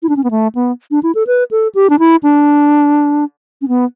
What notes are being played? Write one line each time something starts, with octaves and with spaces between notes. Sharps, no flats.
E4
D4
C#4
B3
A3
B3
D4
E4
A4
B4
A4
G4
D4
E4
D4
C#4
B3